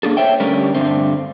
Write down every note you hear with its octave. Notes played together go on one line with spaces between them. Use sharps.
A#3 D4 G#4 A4
C5 C#5 E5 G5
D3 G3 A3 C#4 G4 A#4
G2 D3 A3 C4